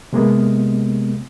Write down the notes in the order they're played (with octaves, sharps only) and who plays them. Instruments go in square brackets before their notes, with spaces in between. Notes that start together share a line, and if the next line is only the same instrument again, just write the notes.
[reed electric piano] C3 G#3 A#3 B3